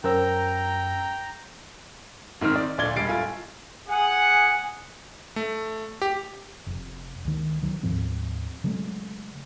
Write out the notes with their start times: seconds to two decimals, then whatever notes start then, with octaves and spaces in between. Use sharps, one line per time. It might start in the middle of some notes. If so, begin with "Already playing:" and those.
0.04 F#2 A#4 C5 G5 A#5 E6
2.41 G#2 D#3 C4 F6
2.56 D5
2.78 D1 D2 A#2 D5 G#6 G7
2.96 E1 G3 A6 C7 D7
3.09 A2 F4 G#5
3.88 G#4 F#5 G#5
5.36 A3
6.02 G4
6.67 F1
7.25 C#2 D#3
7.63 D#3 F#3
7.83 D2 G#2 F3 C4
8.64 C#3 F#3 G#3 A3